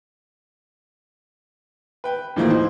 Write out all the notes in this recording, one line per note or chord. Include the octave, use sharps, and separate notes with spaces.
B4 G5
D#2 A2 E3 F3 A3 A#3
D#4 E4 C5